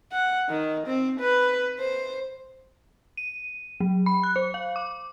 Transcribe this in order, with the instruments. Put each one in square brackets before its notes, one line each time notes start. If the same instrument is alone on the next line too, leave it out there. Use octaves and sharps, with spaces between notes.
[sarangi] F#5
D#3
C4
B4
C5
[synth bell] D#7
F#3
B5
F#6
C5
F5
D6